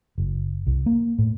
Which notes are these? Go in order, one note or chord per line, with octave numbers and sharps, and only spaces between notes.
F#1
C2
A#3
A2